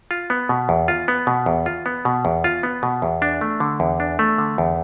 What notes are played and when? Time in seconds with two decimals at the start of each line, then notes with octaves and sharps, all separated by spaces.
0.11 F4
0.30 B3
0.49 B2
0.69 E2
0.88 F4
1.08 B3
1.27 B2
1.46 E2
1.66 F4
1.86 B3
2.05 B2
2.25 E2
2.44 F4
2.63 B3
2.83 B2
3.02 E2
3.22 D4
3.41 A3
3.60 D3
3.80 E2
4.00 D4
4.19 A3
4.38 D3
4.58 E2